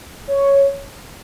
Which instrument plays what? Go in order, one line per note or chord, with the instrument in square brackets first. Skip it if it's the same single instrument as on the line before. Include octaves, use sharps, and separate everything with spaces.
[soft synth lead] C#5